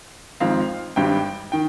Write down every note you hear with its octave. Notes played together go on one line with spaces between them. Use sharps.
G#1 G#2 F3 C4 F5
G#1 G2 G3 G5
D#3 G5